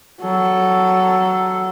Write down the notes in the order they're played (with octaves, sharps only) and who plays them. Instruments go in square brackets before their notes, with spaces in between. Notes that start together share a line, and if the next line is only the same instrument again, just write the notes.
[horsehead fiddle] F#3 A4